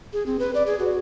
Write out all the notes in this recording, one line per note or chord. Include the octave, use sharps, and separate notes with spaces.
G#4
C4
B4
D5
G#4
F#4